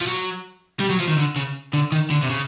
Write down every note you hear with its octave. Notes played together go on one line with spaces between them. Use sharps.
F3
F#3
G3
F#3
F3
D#3
D3
C#3
D3
D#3
D3
C3
C#3